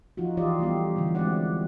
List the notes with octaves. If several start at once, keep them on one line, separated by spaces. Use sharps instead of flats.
F3 D#4 F4 F#4
E3 F4 G4 D5 D#5
G3 A3 B3 G4
D3 E3 F#3 A3
G#3 C4 E4 D5 F#5